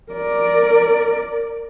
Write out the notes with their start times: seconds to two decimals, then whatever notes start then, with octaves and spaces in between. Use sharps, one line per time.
0.12 A#4 D5